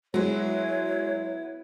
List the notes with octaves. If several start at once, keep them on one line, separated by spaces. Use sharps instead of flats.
F#3 G#3 B3 E4 C#5